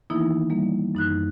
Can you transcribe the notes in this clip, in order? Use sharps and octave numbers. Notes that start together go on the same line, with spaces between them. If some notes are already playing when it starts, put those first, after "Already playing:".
D#3 E3 A#3 B3 D#4 E4
G3 A#3
F#2 D#4 F#6